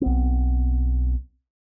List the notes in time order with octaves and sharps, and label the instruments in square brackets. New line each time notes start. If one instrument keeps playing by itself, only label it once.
[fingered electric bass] B1 B3 C4